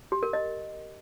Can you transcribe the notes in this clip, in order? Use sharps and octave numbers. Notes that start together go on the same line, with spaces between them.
G4
A#4
D#5